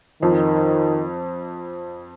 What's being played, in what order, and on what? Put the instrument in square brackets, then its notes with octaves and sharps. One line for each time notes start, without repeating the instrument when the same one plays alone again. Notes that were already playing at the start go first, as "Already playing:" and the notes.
[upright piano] F2 [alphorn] D#3